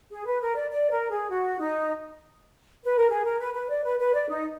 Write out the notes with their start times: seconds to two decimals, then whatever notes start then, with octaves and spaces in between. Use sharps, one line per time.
0.11 G#4
0.26 B4
0.42 A#4
0.56 D5
0.71 D5
0.91 A#4
1.11 G#4
1.30 F#4
1.60 D#4
2.85 B4
2.97 A#4
3.10 G#4
3.25 A#4
3.39 B4
3.54 B4
3.70 D5
3.84 B4
3.99 B4
4.14 D5
4.29 D#4